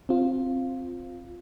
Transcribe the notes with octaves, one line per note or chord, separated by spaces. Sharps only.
C4 F4